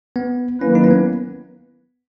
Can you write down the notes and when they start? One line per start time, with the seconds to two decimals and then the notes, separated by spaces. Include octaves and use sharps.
0.16 B3
0.61 D#3 F#3 A#3 C#4 E4 B4
0.75 D#4
0.84 C#4
0.91 B3